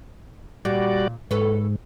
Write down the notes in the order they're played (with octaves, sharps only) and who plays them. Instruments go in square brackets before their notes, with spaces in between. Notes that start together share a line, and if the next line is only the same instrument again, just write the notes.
[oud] A#2 [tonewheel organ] G3 F#4 D5
[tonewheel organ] G#2 [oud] A4 B4 C#5